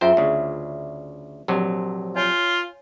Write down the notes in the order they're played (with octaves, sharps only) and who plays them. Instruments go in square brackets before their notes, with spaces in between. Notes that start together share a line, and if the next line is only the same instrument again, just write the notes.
[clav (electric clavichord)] F#2 C5 G5 [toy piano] F4 G#4 E5
[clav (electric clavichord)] D2 C#3
A#1 C3 F#3
[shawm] F4 [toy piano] C#5 G#5